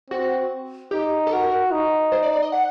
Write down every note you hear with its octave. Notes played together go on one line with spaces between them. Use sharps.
C4 F#4
D#4 G4
A4
F#4 A#4
D#4
C5
D5
D5
D#5
F#5